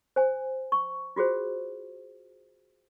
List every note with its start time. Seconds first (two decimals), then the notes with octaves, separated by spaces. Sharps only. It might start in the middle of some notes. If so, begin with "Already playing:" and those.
0.16 C5 G#5
0.72 C#6
1.16 F4 F#4 G#4 C5